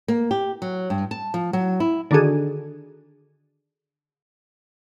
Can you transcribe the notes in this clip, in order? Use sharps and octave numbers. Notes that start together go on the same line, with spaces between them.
A#3
G4
F#3
G2
A5
F3
F#3
E4
D3 D#3 D4 F#4 G#4 A4